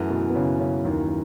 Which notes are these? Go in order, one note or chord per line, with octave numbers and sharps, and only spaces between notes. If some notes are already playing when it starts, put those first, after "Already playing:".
Already playing: F#2 E3 A3
B2 B3
B3
C#3 C#4
C#3 C#4
D#2 D#3